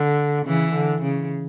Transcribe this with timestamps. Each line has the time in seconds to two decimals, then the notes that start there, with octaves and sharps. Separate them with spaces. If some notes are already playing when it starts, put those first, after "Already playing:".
Already playing: D3
0.46 C#3 E3
0.74 D3
1.02 C#3